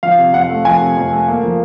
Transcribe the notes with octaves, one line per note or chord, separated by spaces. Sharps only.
F3 F5
C3
F2 F#5
A3
F3 G#5
C3
F2
A3
A#3
F3